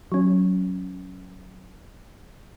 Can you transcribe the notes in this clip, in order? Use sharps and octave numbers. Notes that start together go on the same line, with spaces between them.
F#3 C#4